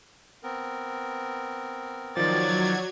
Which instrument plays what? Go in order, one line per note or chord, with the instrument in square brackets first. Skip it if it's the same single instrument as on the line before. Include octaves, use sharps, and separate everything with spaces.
[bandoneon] B3 C4 A#4
[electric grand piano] D#3 F3 [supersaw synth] F#3 G#6 [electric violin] D5 A6